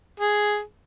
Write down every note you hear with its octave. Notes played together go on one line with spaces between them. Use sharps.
G#4